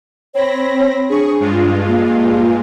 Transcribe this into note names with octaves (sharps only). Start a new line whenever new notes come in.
C4 C#5 B5 A#6
D4 G#4 C#6
G2 G#3 F4
A#3